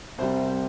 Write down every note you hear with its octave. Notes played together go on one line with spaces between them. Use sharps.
C2 C3 G3 C5